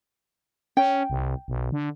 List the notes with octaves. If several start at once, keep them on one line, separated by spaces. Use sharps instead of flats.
C#4 G5
C2
B1
D3